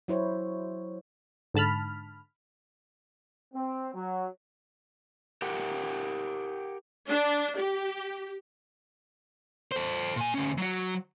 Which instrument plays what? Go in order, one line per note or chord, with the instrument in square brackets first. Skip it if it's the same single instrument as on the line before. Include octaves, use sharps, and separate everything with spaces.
[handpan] F#3 E4 C5 C#5
[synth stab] G#2 D3 A5 B5 F6
[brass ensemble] C4
F#3
[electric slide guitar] G4 A#4 F#5 G5
[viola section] D4
G4
[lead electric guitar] A4 C5
A#2 G#5
D2 C#4
F#3 F#4